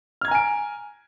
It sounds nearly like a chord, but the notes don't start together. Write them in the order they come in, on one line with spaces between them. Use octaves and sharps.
F6 G#6 A#5 G#5 D7